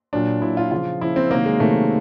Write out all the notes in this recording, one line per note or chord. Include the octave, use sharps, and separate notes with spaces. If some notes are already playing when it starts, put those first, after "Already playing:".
A#2 F#3 D4
A#2 F#3 E4
F4
C#3 F3 F4
C#3 F3 E4
C4
C3 D#3 F#3 A#3
G#3
C3 D#3 F#3 A3